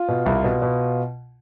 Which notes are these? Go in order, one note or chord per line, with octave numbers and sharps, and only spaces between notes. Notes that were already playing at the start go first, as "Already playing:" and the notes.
Already playing: F4
B2
C2
B2
B2